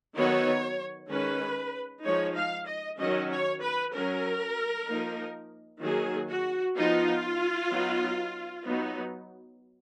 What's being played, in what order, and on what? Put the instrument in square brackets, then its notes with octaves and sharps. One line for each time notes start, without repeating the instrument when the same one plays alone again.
[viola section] D#3 F#3 B3 D#4 C#5
D#3 G#3 C#4 B4
F3 G#3 D#4 C#5
F5
D#5
D#3 F#3 C#4 D#5
C#5
B4
F#3 C#4 A#4
F3 A#3 D#4
D#3 F#3 A#3 G#4
F#4
F3 B3 D#4 F4
F#3 B3 D#4
F#3 B3 D#4